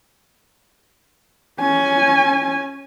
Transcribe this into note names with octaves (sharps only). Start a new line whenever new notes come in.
C#4 G#5